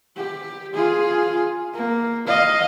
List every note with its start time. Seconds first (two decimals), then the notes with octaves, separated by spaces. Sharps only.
0.16 G4
0.74 F4 G#4
1.74 A#3
2.27 D#5 F5